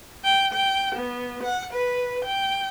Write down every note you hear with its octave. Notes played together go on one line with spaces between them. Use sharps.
G5
G5
B3
F#5
B4
G5